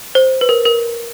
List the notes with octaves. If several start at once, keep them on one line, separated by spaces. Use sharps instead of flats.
C5
B4
A#4
A#4